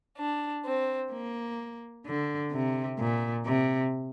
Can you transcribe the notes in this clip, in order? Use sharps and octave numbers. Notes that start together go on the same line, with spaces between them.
D4
C4
A#3
D3
C3
A#2
C3